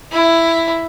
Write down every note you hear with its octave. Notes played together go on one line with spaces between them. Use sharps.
E4